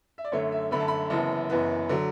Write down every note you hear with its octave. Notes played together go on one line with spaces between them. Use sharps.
E5
D5
F#2 D3 A3 C#5
E5
F#2 D3 A3 B5
A5
B5
F#1 F#2 E3 B3 A5
F#1 F#2 E3 B3
D3 F#3